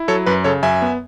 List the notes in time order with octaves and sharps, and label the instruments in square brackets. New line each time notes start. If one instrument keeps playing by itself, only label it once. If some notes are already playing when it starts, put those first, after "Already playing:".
Already playing: [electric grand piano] E4
F#3 A4 C#5
F#2 B4
C#3 A4 C#5
F#2 E5 G#5
B3